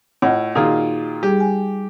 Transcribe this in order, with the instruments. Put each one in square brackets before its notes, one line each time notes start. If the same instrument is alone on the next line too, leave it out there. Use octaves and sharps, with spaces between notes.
[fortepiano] A2 [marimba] F4 D#5 F#5
[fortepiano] A#2 D#3 F4 [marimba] D#4 F#4 G#4
[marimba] G3 G#4 [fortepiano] G4
[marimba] G#5